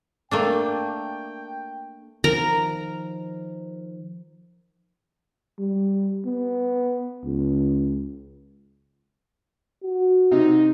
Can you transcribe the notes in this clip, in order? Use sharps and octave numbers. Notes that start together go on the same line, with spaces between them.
A3 A#3 D4 G5
D#3 F3 A#4 A#5
G3
B3
C#2
F#4
C3 D#4